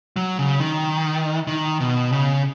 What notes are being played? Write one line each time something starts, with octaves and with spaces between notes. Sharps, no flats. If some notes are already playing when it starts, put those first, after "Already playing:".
F#3
C#3
D#3
D#3
B2
C#3